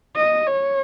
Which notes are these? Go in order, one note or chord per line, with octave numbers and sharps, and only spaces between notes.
D#5
C#5